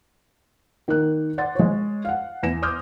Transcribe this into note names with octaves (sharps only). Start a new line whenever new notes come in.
D#3 A#3 F#6
D5 F#5 C6 A6
G#3 C#5
F5 F#5
E2 A#6 E7
C6 D6 D#6 F6 G6